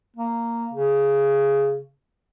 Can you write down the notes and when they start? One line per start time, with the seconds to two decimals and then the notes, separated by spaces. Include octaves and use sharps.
0.16 A#3
0.74 C#3